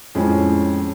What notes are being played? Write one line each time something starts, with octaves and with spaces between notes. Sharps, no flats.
F2 A2 G#3 C#4